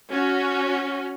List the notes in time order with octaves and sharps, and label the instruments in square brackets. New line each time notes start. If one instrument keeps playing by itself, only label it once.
[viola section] C#4 F#4